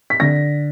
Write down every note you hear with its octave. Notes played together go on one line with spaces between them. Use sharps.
B6
D3 A#6